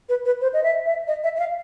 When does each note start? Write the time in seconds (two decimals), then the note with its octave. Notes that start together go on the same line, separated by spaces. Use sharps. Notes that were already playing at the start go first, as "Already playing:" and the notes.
0.09 B4
0.25 B4
0.41 C5
0.53 D#5
0.63 E5
0.86 E5
1.08 D#5
1.24 E5
1.36 E5
1.39 F5